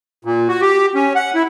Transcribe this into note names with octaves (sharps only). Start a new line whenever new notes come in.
A#2
F#4
G4
C#4
F#5
E4